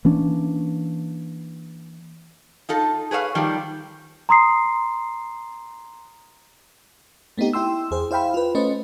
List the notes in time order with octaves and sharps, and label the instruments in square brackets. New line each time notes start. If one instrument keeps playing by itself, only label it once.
[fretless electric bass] E3 A#3 C#4 D4
[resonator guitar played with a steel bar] D#4 F4 A4
G#4 B4 C#5 E5 F5
D#3 F3 G3
[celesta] A#5 C6 D#6 C7
[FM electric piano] A3 B3 C4 D#4 G4
E4 G5 C6 E6
E2 G#4 C5
E4 C5 F5 G5 B5
F4 B4
A3 C#4 B4 C5 D#5